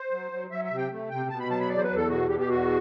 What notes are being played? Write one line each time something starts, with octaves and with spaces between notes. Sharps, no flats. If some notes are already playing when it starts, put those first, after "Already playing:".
Already playing: C5
F#3
F#3
F#3 E5
E5
C3
G5
A3
C3 G5
B2 A5
B5
F#3 A5
B5
E2 D5
C5
B4
E2
A4
B2 F#4
B2 G4
G4
E2 F#4